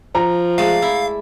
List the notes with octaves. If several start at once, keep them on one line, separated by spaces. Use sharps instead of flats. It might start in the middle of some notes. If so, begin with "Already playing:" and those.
F3 A#5
G#3 A3 D5 F5
E4